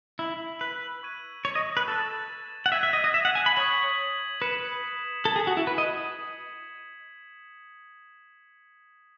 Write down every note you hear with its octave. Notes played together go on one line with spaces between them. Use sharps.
E4 E6 B6 F#7
B4
C#6 E6 G#6 D#7
C#5
D#5
B4
A4 F#6 A6 E7
F#5
E5 G#6 B6 D#7
E5
D#5
D#5
E5
F#5
G#5
B5
C#5 D#6 G#6 B6 F#7
B4 G#6 C#7 E7
A4 G#6 B6 F#7
G#4
F#4
E4
B4
D#5